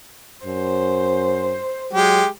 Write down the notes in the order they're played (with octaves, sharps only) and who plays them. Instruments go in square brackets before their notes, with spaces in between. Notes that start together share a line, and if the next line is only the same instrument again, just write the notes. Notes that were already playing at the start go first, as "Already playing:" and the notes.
[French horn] F#2 [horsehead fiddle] C5
[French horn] F#3 [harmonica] G#3 G4